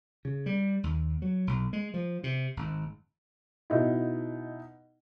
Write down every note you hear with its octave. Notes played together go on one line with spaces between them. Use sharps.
C#3
G3
D#2
F#3
B1
G#3
F3
C3
G#1
B2 D#4 E4